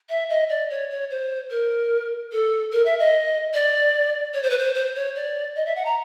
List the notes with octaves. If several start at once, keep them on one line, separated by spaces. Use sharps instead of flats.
E5
D#5
D5
C#5
C#5
C5
A#4
A4
A#4
E5
D#5
D5
C#5
C5
B4
C5
C5
C#5
D5
D#5
E5
F#5
A#5